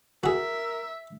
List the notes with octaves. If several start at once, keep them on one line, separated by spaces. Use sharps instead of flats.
F#4 G#4 A#4 E5